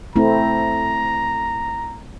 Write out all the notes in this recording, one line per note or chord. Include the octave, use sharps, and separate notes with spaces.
A3 C4 E4 A#5